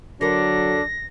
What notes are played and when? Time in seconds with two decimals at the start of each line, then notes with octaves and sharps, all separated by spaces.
0.21 D3 F#3 D4 A#4 A#6